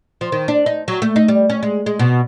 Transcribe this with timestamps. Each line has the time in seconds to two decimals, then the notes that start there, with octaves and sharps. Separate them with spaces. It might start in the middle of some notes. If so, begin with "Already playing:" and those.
0.21 F3
0.32 D#3
0.48 D4
0.66 D#4
0.88 F#3
1.02 A3
1.16 D#4
1.28 G3
1.50 C#4
1.63 G#3
1.86 G#3
1.99 B2